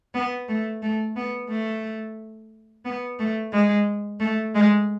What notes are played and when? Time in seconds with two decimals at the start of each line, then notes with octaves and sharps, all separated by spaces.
0.14 B3
0.49 A3
0.82 A3
1.16 B3
1.49 A3
2.85 B3
3.19 A3
3.52 G#3
4.20 A3
4.55 G#3